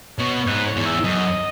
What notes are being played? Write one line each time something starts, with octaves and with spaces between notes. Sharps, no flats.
B2 C#5
G#2 B4
C#5
E2
E5
F#2 D#5